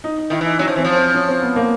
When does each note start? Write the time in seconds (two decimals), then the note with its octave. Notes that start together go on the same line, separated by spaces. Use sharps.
0.04 D#4
0.18 D#4
0.30 D#3 E4
0.41 E3 D#4
0.59 F#3 C#4
0.68 F3
0.76 E3 C4
0.84 F3
0.96 C4
1.14 C#4
1.28 C4
1.42 B3
1.56 A#3